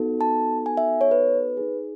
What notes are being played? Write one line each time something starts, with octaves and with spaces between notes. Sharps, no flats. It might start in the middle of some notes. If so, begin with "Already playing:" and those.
Already playing: B3 D#4 F#4 A4
A5
G#5
E5
C#5
B4
D#4 G#4